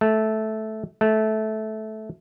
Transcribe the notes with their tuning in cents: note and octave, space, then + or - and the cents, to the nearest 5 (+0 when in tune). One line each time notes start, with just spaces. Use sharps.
A3 -10
A3 -15